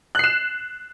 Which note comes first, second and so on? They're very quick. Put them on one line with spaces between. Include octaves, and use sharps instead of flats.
F#6 C7 E7